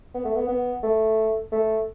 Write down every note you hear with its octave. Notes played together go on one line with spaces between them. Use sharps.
B3
A3
B3
B3
A3
A3